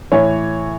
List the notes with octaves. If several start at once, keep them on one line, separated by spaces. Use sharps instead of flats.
A2 E3 C#5